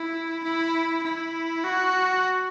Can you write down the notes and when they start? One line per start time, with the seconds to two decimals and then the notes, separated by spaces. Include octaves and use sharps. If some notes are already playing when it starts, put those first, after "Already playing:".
Already playing: E4
0.44 E4
1.04 E4
1.64 F#4